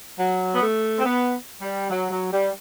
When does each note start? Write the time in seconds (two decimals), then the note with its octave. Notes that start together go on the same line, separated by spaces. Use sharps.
0.19 F#3
0.55 B3
0.62 A3
0.98 C4
1.05 B3
1.61 G3
1.90 F#3
2.11 F#3
2.33 G3